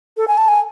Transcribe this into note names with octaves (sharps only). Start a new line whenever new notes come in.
A4
G#5
A5
G#5